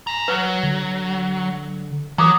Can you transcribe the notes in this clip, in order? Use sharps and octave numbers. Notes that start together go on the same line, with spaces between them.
G#5 A#5
F#3 B4
D3
E3 F#3 A#5 D6 D#6